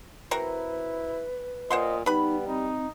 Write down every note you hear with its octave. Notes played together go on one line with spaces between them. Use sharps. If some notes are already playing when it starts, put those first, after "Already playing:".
C4 E4 F#4 A#4 B4
A#2 C5 D#5 F#5 C6
G3 B3 D#4 B4 B5
C4 D#4